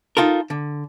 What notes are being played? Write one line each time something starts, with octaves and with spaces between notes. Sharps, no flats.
D#4 F4 A4 A#4
D3